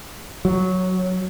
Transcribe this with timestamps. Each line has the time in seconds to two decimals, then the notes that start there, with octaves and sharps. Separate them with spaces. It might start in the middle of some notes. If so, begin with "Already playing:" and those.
0.45 F#3